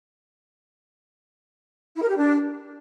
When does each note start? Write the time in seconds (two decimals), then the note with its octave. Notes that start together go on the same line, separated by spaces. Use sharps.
1.95 E4
2.02 A#4
2.09 G4
2.16 D4